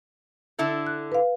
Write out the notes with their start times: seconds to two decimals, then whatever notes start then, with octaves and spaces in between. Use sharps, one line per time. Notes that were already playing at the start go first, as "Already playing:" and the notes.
0.59 D3 E4 A4
0.87 F#6
1.12 B4 F5